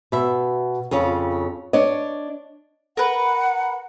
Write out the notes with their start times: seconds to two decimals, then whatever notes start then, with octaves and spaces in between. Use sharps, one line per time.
0.12 B2 E5
0.91 F2 C#3 C#4 F4
1.73 D4 C#5 D#5
2.97 A#4 B4 F#5